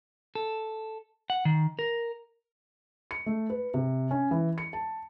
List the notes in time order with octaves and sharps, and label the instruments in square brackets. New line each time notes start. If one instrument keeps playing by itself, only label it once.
[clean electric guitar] A4
F#5
D#3
A#4
[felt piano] C#7
A3
B4
C3
C#4
E3
C#7
A5